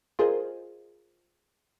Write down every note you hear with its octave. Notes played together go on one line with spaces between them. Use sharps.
F4 G#4 A#4 C5 D#5